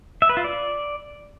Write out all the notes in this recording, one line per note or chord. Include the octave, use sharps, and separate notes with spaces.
E5
B4
F4
D5